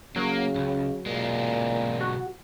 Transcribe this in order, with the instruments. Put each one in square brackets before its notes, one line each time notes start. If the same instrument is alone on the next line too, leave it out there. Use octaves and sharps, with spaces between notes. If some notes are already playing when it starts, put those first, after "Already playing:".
[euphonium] C#3 [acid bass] F#3 [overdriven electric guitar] A#3
[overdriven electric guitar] C#2
[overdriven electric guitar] B1 G#3 [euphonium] A#2
[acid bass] F#4